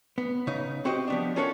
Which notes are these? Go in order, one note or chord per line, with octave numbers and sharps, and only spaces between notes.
B3
C#3 D#4
C4 F#4 G4 C5 D#5
F3 B3 D4
C#4 F4 A4 A#4 C#5 F#5